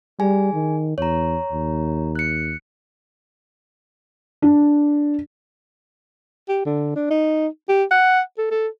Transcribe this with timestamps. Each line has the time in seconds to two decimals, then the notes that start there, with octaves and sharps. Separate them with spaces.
0.20 G3 G#4 G#5
0.54 D#3
0.98 E2 C#5 A#5
1.52 D#2
2.16 F#6 C#7
4.42 D4
6.48 G4
6.65 D3
6.95 D4
7.10 D#4
7.69 G4
7.91 F#5
8.38 A4
8.51 A4